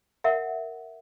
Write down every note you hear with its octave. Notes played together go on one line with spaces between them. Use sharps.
A#4 E5 F#5